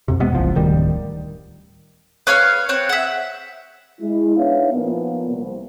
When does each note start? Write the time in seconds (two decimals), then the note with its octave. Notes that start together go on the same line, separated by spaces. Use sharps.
0.08 F2 C3
0.20 C3 G#3 B3
0.32 F#1 C2 F3
0.55 D1 D#3 G3
2.27 B4 C#5 F5 F6
2.69 C4 C#5 F#6
2.89 E5 F#5
4.01 G#3 E4
4.37 B3 D4 D#4 C#5 E5 F5
4.73 A#2 F3 A#3 B3
5.29 C2